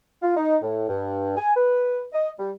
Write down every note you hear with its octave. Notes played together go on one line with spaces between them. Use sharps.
F4
D#4
A2
G2
G#5
B4
D#5
G3